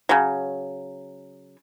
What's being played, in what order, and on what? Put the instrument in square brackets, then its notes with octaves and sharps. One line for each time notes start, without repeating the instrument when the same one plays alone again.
[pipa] C#3 F#3